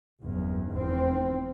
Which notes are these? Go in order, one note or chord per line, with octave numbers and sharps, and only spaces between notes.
F#1 E2 G2
F1 E2 C4